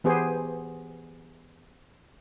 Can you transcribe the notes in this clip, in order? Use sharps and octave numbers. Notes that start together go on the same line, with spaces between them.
E3 B3 G4 G#4 C5